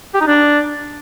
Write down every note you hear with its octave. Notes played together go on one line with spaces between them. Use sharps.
G4
D#4
D4